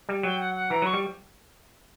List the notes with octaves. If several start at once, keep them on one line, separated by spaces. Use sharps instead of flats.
G3
F#3 G5
F#5
F#5
E3 A#5
F#3 C#6
G3